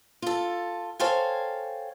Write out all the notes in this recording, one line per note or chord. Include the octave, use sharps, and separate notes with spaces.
F4 A4
A4 C5 C#5 F5 G5 G#5